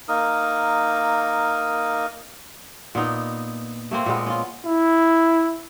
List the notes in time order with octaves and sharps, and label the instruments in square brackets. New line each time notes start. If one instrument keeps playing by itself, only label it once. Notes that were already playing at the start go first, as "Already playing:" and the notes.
[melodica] A#3 D#4 A#4 D#6
[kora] A#2 B3 D#4
A3 A#3 C4
A#2 G#3 B3
C#4 F4
[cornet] E4